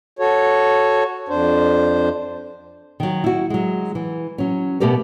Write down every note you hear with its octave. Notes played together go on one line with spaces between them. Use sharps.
F#4 A4 C#5
F2 D4 C5
D#3 F#3
E4 F#4
F#3 G#3
E3
F#3 C#4
B2 A3 B3 G4 A#4 B4